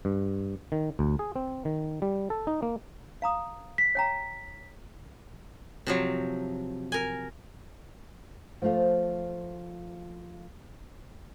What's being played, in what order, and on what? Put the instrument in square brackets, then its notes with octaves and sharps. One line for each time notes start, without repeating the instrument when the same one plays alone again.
[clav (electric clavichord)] G2
D#3
D2
G#4
C4
D#3
G3
A4
D#4
A#3
[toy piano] F5 A#5 D#6
[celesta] B6
[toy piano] C#5 G5 A#5
[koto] C3 F3 F#3
A#4 G#5
[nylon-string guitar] F3 A3 F4 C5 F5